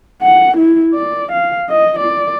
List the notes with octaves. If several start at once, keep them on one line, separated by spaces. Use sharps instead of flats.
F#5
E4
D5
F5
D#5
D5